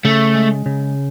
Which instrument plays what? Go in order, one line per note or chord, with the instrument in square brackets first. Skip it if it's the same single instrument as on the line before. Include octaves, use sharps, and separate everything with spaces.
[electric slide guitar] C#3 [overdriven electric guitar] A3
[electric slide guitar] G#3
C#3